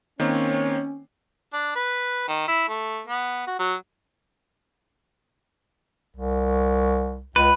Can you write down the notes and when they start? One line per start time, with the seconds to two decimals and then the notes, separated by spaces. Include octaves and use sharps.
0.20 D#3 A#3 C4 C#4 C#5
1.53 D4
1.76 B4
2.28 D#3
2.48 E4
2.68 A3
3.08 B3
3.47 F#4
3.59 F#3
6.17 C2
7.36 C#2 B4